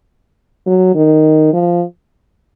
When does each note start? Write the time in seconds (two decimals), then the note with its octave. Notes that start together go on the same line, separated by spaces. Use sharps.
0.66 F#3
0.95 D#3
1.54 F3